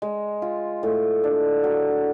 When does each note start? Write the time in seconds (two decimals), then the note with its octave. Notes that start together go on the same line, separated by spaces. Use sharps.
0.02 G#3
0.42 F4
0.83 A2
1.24 D4
1.64 F#3